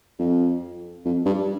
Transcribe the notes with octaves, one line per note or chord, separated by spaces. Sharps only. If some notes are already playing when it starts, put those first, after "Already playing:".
F2
F2
G2